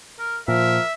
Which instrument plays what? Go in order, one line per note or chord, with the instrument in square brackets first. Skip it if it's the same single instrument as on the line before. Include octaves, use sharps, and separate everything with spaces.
[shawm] A#4
[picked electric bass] A#2 [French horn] F3 [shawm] A#4 [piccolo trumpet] E5